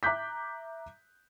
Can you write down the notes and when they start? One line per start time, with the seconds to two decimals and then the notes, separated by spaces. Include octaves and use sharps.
0.03 E5 A#5 D6 F#6 G6 B6